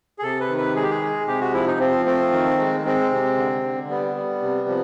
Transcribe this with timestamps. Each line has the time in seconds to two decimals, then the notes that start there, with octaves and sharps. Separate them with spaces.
0.19 G#4
0.23 C3 A4
0.40 B4
0.49 D#3
0.57 B4
0.75 G#3 G#4
0.83 G4
0.90 G#4
1.02 G#3
1.27 C3 G4
1.41 F#4
1.53 F3 E4
1.67 D#4
1.80 F3 C4
2.06 A3 C4
2.32 D#3
2.58 G#3
2.85 G#3 C4
3.11 C3
3.37 D3
3.63 D3
3.89 G3 B3
4.15 G3
4.42 C3
4.68 F3